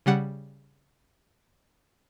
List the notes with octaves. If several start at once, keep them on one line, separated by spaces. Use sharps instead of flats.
C#3 G3 F#5